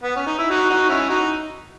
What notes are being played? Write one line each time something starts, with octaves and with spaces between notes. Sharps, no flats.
B3
C#4
D#4
E4
D#4 F#4
D#4 F#4
C#4 E4
D#4 F#4